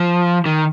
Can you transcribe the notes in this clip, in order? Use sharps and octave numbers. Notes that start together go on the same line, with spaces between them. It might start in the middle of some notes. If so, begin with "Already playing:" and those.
Already playing: F3
D#3